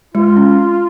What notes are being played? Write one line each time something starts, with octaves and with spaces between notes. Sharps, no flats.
G#3 F4
C#4